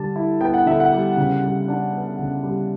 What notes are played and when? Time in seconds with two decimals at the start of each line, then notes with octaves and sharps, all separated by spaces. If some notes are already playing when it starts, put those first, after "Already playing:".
Already playing: D3 G3 A5
0.16 E4
0.41 B3 G5
0.54 F#5
0.66 D3 E5
0.80 F#5
0.92 G3
1.17 C#3
1.43 G3
1.68 D4
1.93 B3
2.19 C#3
2.44 G3